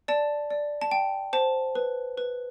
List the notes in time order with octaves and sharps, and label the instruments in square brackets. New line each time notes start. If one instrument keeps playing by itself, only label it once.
[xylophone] D5 A5
D5
A5
G5
C5 A5
B4
B4